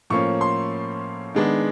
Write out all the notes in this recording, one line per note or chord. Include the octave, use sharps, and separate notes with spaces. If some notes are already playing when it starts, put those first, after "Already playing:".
A2 F3 A#3 C#4 C#6
C6
D#3 G#3 B3 D4